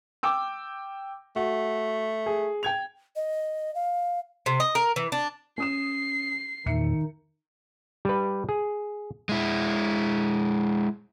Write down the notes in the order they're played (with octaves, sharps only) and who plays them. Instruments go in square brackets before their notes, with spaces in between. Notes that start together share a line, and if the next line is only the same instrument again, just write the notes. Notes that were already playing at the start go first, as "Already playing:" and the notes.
[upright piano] G5 D6 E6
[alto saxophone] A3 [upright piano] F#4
[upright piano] G#4
G5 G#6 F7
[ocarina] D#5
F5
[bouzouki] C3
D#5
A#4
E3
D4
[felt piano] C#4 D#6 E7 [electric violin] C7
[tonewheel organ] E2 A#2 [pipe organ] D#3 D#4 [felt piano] E5 C#7
[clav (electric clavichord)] G3 B4
G#4
[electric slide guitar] G#3 E4